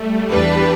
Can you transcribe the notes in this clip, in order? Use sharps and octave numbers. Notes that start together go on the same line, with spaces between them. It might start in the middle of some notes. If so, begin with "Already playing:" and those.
Already playing: G3 A3
E2 E3 G3 D4 G4 B4